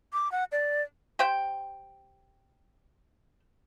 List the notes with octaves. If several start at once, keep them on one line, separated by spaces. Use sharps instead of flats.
D6
F#5
D5
G4 C5 G5